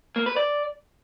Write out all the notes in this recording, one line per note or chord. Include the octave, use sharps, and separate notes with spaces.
A#3
B4
D5